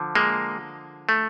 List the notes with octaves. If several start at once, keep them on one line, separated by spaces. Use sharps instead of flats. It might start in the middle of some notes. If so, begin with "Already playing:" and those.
Already playing: D3 F3
G#3 A#3
A3